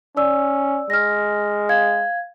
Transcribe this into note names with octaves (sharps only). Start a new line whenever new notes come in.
C#4 D5 E6
G#3 F6 A#6
F5 G#6